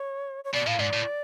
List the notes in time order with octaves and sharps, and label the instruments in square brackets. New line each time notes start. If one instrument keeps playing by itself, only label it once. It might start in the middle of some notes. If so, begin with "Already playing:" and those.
Already playing: [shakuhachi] C#5
C#5
[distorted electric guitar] B2 [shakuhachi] D5
[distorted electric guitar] A2 [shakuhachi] F5
[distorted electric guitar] G#2 [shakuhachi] D5
[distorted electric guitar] A2